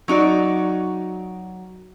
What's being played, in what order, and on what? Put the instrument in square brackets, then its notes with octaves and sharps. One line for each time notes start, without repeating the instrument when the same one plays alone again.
[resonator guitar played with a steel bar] F#3 D#4 F#4 D5